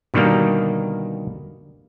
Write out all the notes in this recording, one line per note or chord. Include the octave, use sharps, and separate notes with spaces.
B2 D3 D#3 G3 A#3